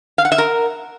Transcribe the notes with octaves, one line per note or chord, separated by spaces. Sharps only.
F5
F#5
E5
A#4